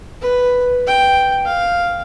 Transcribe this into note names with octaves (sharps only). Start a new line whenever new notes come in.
B4
G5
F5